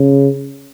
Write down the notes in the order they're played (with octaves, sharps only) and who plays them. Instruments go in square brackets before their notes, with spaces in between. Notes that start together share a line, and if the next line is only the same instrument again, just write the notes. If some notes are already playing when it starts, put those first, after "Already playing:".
Already playing: [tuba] C#3